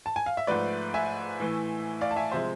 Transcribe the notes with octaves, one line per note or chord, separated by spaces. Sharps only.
A5
G#5
F5
E5
G#2 F3 A3 B4 D5
E5 G#5
A2 E3 A3
D5 F5
A5
E5 G#5
C3 F3 G#3 C5 E5